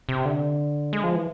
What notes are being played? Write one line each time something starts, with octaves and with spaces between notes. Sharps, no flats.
C3
D3
G#3
F3
E3